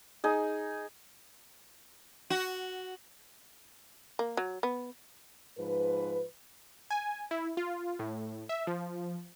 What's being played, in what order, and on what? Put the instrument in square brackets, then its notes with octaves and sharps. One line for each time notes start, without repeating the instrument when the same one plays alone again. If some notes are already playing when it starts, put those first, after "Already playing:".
[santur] D#4 G#4
[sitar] F#4
[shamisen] A#3
F#3
B3
[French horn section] G#2 F3 B4
[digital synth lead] G#5
E4
F4
A2
E5
F3